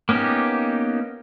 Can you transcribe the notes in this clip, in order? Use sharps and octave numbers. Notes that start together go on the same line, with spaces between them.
A#3 B3 C#4 D#4 G4